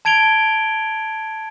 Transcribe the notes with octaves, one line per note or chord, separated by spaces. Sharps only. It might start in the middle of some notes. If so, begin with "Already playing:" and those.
A5 G#6 D7 F7 G7